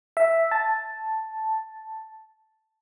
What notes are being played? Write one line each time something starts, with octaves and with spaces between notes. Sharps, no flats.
E5
A5